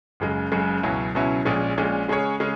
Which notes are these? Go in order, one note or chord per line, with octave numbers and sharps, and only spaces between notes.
F#1 F#2 C#3 G#3
F#1 F#2 C#3 G#3
C#2 B2 F#3 C#4 E4
C#2 B2 F#3 C#4 E4
A#1 A#2 G#3 C#4
A#1 A#2 G#3 C#4
C#3 G#3 C#4 G#4 C#5
C#3 G#3 C#4 G#4